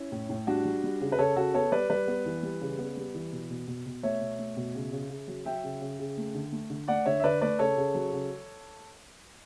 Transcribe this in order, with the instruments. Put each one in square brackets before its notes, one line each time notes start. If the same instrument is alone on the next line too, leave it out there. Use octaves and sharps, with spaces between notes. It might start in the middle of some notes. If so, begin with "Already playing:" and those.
Already playing: [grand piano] C#4 E4
A2
A2
G3 D4 F#4
G3
G3
C#3
B4
C#3 A4 C#5
C#3 F#4 A4
B3 A4 C#5
G3 B4 D5
G3 B4 D5
B3
E3
G3
C#3
B3
G3
E3
B2
B2
B2
B2
A3 C#5 E5
B2
A3
B2
C#3
C#3
C#3
F#3
F#3 E5 G5
C#3
C#3
C#3
A3
D3
A3
D3
A3 D5 F#5
D3 C#5 E5
E5
D3 B4 D5
A3 B4 D5
C#3 A4 C#5
C#3
F#3
C#3